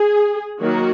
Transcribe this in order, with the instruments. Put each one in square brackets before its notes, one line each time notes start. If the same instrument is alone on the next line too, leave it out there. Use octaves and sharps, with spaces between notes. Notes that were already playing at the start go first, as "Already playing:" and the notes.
Already playing: [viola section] G#4
D#3 F#3 A#3 F#4